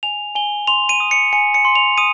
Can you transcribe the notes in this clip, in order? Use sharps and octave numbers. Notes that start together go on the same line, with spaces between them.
G#5 F7
G#5 G7
C6 F7
D#7
D#6
C#7
G#5 C#7
C#7
C6
F7
D#6 D#7